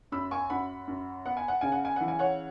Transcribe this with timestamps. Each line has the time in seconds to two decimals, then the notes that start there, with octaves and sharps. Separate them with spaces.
0.12 F#2 B5 E6
0.31 G#5 C#6
0.50 F#2 F#5 B5
0.88 F#2
1.26 B3 F#5
1.37 G#5
1.48 F#5
1.61 C#3 G#5
1.72 F#5
1.85 G#5
1.96 E3 F#5
2.08 G#5
2.19 C#5 F#5